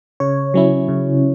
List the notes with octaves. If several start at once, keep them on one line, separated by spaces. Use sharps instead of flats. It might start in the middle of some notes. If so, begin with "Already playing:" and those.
C#3 C#5
F#3 C#4 E4
C#3